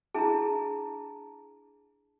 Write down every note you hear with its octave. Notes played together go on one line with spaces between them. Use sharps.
D4 E4 G#4 A5 A#5